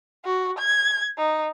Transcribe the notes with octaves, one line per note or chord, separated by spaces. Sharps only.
F#4
G#6
D#4